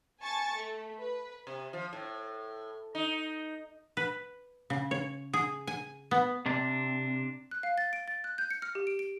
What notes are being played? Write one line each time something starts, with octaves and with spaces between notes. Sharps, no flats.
G#5 A5 C#6 A6
A3
B4
C3
F3
A2
D#4
B4
C#3
C#5
G#4
G#5
B3
C3 D4
F#6
F5
A6
D7
A6
F#6
G6
C#7
F6
G4
D7
D7